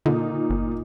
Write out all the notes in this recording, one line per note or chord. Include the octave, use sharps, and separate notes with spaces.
A#2 D3 D#4
G1